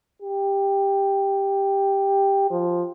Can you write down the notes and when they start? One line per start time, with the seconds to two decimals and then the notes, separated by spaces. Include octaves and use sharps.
0.22 G4
2.50 F3